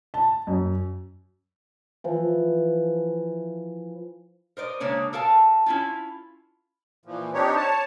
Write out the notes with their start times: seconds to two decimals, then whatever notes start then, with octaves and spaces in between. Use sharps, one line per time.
0.14 A5
0.47 F#2
2.04 E3 F3
4.57 A#4 C5 D5 D#5
4.80 C#3 G#3 A#3 D4 C#5
5.13 A4 A#4 F5 A5
5.66 C#4 E4 F4
7.05 A#2 E3 F3
7.34 C4 D4 D#4 G4 C#5
7.56 C#5 A5